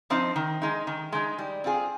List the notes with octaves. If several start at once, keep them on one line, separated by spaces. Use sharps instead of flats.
F3 C4 D#4
D#3
G#3 D#4
D#3
G#3 D#4
G3
C4 F4 G#4